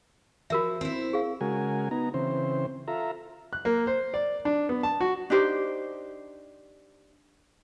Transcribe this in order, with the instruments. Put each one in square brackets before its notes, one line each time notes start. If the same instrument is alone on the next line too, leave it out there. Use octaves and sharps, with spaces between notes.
[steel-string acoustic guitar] F3 [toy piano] F#4 A#4 E5
[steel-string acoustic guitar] C4 E4
[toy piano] G#4 F5
[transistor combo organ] C#3 G#3 F#4 A#4 G#5
B3 D#4 A#5
C#3 E3 C4 C5
F4 A4 E5 A#5
[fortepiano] F#6
A#3
C5
D5
D4
B3
A5
F#4
[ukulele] D4 D#4 G4 C5